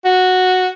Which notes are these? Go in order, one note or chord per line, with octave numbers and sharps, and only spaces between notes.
F#4